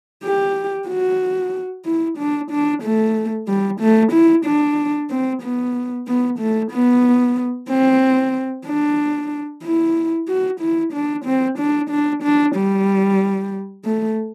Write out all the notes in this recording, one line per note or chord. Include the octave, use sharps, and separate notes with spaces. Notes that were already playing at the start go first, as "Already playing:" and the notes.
G4
F#4
E4
D4
D4
A3
G3
A3
E4
D4
C4
B3
B3
A3
B3
C4
D4
E4
F#4
E4
D4
C4
D4
D4
D4
G3
A3